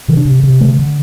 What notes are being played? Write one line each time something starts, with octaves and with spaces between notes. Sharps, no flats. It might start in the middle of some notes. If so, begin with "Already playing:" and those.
C3 E3
D4
C3
C3
D3 A3
D3